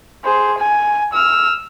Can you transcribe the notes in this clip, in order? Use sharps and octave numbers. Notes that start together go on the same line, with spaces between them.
G#4 C5
G#5
E6 F6